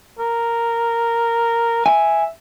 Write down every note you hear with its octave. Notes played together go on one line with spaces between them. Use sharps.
A#4
E5 G#5